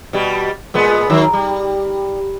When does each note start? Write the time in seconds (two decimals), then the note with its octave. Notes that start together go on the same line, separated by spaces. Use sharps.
0.13 B2 G3
0.74 A#2 G#3 B3
1.10 D#3 F#3
1.33 G3